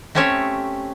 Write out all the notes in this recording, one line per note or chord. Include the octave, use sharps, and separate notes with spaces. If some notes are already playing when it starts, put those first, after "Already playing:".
A3 C4 C#4 G4 C#5 E5